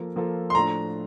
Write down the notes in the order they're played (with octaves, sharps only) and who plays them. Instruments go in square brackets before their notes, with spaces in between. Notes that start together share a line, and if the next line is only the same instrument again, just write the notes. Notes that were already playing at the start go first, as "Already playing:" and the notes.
Already playing: [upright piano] F3 A#3 F4 A4
F3 A#3 F4 A4
[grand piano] C6
[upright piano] A2 F3 A3 D4 [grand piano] A#5